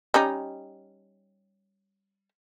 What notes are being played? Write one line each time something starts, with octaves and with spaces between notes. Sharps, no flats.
G3 C#4 D#4